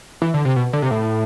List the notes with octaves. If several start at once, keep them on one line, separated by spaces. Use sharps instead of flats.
E3
D3
C3
B2
D3
C3
A2